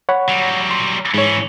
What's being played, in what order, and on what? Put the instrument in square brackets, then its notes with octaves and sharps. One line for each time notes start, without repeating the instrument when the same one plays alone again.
[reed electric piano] C#5 F#5 B5
[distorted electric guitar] F#3 G3
[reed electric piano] C6
[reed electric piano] G#2 C#5 [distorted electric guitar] E3 C#4